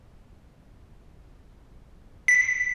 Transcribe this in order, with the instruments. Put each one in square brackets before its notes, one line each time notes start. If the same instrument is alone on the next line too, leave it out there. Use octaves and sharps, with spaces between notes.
[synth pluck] B6